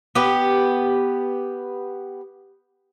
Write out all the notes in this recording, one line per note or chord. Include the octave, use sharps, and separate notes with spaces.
B3 G4